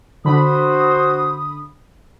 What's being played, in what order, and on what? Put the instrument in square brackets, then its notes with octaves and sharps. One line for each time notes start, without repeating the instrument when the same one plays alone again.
[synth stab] D3 B5 [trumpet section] F#4 C5 [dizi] D#6